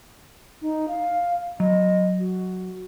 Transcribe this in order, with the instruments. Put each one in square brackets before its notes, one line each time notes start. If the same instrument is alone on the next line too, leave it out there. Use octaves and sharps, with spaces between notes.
[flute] D#4
F5
[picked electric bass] F#3 [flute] D#5
[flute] F#4